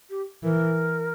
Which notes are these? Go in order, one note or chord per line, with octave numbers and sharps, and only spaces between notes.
G4
E3 A#4